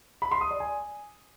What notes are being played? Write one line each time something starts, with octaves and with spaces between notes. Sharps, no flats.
B5
C6
D#6
D5
G#5